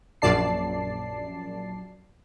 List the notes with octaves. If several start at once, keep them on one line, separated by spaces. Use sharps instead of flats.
A#1 F#2 D5 A5 C7